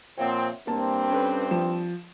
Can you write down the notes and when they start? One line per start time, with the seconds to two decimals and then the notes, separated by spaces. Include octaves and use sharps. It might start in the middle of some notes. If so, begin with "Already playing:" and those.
0.18 A#2 F3 C4 C#5 E5 F#5
0.67 G2 A#3 C4 A5
1.10 C#4 A4 B4
1.51 F3 E7